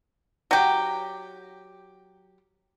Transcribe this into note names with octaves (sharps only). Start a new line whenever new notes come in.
F#3 G4